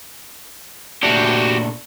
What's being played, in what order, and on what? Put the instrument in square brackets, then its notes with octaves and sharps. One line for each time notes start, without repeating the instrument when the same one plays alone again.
[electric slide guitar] A#2 A3 D4 [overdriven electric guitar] F#4 G4